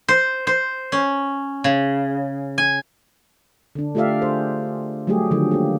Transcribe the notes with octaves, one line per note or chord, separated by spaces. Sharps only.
C5
C5
C#4
C#3
G#5
D3 D4
A3 F4 G4 D5 E5 F5
G#4 C5
F#3 G3 A3 G4 G#4
D3 D#3 F3 F#3
A#3 G4